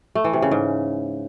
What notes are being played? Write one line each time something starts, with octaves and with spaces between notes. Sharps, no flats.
A3
E3
C3
C#3
G#2